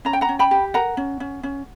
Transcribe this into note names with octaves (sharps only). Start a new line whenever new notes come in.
C#4 A#5
G5
F#5 A#5
C#4
G5 B5
G4
A#4 F#5 A#5
C#4
C#4
C#4